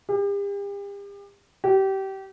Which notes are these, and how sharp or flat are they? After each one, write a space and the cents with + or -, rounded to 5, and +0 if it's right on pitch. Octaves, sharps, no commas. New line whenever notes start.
G4 +40
G4 -25